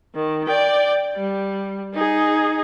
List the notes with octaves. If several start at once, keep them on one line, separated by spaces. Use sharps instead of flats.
D#3
D5 G5
G3
D#4 G#4